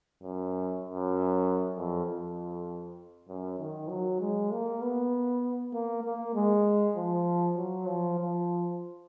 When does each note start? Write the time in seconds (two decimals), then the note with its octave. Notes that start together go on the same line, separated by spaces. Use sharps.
0.23 F#2
0.84 F#2
1.76 F2
2.06 F2
3.29 F#2
3.60 D#3
3.89 F#3
4.20 G#3
4.51 A#3
4.82 B3
5.73 A#3
6.04 A#3
6.35 G#3
6.96 F3
7.57 F#3
7.88 F3
8.18 F3